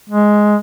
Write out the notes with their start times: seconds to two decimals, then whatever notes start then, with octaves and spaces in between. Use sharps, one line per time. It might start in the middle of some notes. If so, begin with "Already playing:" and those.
0.09 G#3